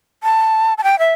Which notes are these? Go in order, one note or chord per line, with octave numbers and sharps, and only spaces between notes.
A5
A5
G5
E5